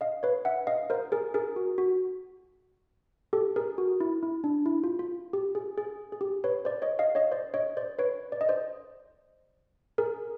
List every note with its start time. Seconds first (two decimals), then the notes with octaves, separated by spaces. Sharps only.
0.01 D#5 F5
0.23 B4 C#5
0.45 E5 F#5
0.67 D#5 F5
0.90 A#4 C5
1.12 G#4 A#4
1.34 G#4 A#4
1.56 F#4
1.78 F#4
3.33 G4 A4
3.56 G#4 A#4
3.78 F#4
4.00 E4
4.23 E4
4.44 D4
4.66 E4
4.84 F4
4.99 F4
5.33 G4
5.55 G#4
5.78 G#4
6.12 G#4
6.21 G4
6.44 B4 C#5
6.65 C5 D5
6.82 C#5 D#5
6.99 D#5 F5
7.15 C#5 D#5
7.32 C5 D5
7.54 C#5 D#5
7.77 C5 D5
7.99 B4 C#5
8.32 D5
8.41 D#5
8.49 C5 D5
9.98 G#4 A#4